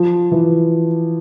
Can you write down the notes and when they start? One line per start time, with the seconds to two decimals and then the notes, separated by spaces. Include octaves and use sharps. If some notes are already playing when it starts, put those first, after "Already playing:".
Already playing: F3
0.32 E3